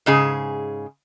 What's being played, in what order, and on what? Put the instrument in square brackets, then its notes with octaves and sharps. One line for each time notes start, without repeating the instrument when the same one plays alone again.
[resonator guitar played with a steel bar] G#2 C#3 G#4